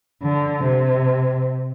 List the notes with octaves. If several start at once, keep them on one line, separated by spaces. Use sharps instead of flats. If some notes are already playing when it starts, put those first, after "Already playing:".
D3
C3